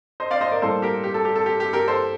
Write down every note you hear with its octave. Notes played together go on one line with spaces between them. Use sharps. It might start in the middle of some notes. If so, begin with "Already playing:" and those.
C5 D#5
D5 F5
C5 D#5
A#4 D5
A2 G3 A#3 A4 C5
G4 A#4
G4
A4
G4
A4
G4
G4
G4 A#4
A4 C5